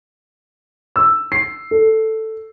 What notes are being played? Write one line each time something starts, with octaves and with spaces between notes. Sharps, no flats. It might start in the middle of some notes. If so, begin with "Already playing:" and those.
E6
C7
A4